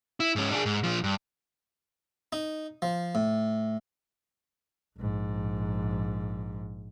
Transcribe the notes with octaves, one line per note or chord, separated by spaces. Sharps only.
E4
G#2 C#4
D4 G#4
G#2
A#2 F3
G2
D#4
F3
A2
A#1 G#2